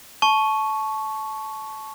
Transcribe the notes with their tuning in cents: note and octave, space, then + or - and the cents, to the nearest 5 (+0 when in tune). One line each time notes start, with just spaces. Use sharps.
A5 -20 C#6 +0